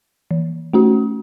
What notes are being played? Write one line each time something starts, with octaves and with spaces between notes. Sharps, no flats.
E3
A3 C#4 F#4